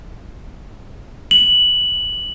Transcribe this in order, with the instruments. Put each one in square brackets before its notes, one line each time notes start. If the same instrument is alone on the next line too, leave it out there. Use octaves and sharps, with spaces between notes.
[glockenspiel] F#7